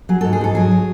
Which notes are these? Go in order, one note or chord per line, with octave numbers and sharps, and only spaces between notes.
F#3 G#4
G#2 A4
G#4
G#2 A4
F#3 G#4
F#3